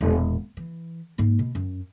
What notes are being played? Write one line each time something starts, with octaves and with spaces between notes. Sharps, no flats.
E1 A#2
E3
G#2 A#3
B2
F#2